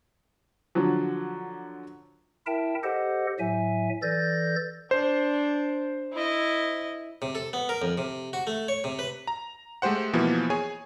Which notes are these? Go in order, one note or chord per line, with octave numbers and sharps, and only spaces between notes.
D3 F3 F#3
E4 A#4 E5 G5 A5
G4 A4 C5 D#5 F#5
A2 F#3 E5 G#5
E3 A4 D5 G6 A6 A#6
D4 C5
E4 D#5
C3
A4
B3
A#4
F2
C3
F#4
A3
C#5
C3
B4
A#5
G#3 A3 G4 C5 F#5
B2 E3 F3 A#3 B3
G#4 C#5 G#5